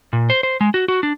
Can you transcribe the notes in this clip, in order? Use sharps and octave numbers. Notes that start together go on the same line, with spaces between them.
A#2
C5
C5
G#3
F#4
F#4
D4